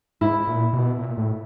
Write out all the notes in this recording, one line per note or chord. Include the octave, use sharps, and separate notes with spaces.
G#2 E4
A#2
B2
A#2
A2